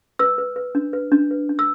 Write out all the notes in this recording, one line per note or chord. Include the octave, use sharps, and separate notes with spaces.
B4 E6
B4
B4
D4
B4
D4
B4
D4
E6